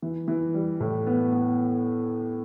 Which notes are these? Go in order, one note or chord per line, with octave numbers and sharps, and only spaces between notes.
E3
E3
G3
A2
B3
B3